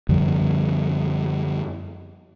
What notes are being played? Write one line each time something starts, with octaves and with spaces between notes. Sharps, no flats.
F#2 D3 F3 G3